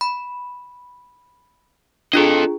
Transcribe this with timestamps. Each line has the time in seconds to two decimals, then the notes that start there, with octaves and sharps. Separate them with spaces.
0.01 B5
2.13 D4 F4 G#4 A4 D#5